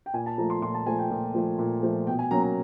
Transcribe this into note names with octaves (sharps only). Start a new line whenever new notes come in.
G5
A#2 G#5
A5
F3 A3 A#5
C6
A#2 C6
A5
F3 A3 G#5
G5
A#2
F3 A3
A#2
F3 A3
B2 G5
G#5
F#3 A#3 C#4 A#5
A#5